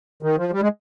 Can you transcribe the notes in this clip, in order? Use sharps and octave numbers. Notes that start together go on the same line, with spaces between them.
D#3
F3
G3
G#3